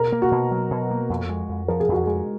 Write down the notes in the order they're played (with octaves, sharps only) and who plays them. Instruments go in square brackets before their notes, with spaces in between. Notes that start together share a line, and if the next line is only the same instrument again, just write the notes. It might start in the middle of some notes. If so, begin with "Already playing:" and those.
Already playing: [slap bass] B2 [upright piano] A#4
[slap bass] A#3
[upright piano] F#4
[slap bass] B2
F#3
B2
A#3
F2
G#3
F2
[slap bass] F3 [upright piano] A#4
[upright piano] G#4
[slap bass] F2 [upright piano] F#4
[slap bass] G#3 [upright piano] G#4